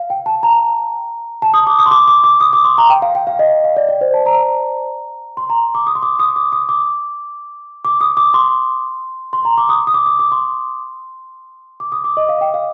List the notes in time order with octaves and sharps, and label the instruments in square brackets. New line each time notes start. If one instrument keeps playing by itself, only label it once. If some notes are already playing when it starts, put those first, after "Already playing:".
Already playing: [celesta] F5
G5
A5
A#5
A5
D#6
D6
D#6
C6
D6
D6
D6
D#6
D6
C6
A#5
G5
F5
G5
F5
D#5
F5
D5
D5
C5
A5
A#5
C6
A#5
D6
D#6
C6
D6
D#6
D6
D#6
D6
D6
D#6
D6
C6
C6
A#5
D6
D#6
D#6
D6
D6
D6
C6
D6
D#6
D6
D#5
F5
G5
F5